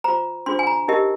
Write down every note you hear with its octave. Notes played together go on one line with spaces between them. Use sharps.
F4 C5 A#5
D4 F4 G#4 C5 C6
G#5
A#5
D#4 G4 A#4 D#5